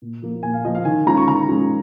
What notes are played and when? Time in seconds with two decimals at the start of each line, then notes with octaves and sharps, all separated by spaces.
0.02 A#2
0.22 F3 A#3
0.43 A#2 G#5
0.54 F5
0.64 F3 A#3 D#5
0.75 F5
0.85 D#3 G#5
1.07 G#3 C#4 F4 A#5
1.17 C#6
1.28 D#3 A#5
1.48 G#3 C#4 F4